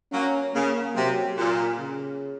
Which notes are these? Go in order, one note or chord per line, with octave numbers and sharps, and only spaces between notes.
F#3 A#3 C#4
C#3 A#3
C3 F#3
A#2
C#3